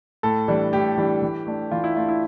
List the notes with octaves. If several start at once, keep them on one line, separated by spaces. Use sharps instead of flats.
A2 A4
E3 G3 D4
A2 G4
E3 G3 D4
E3
A3 D4
E3 F4
E4
A3 D4 F4
E4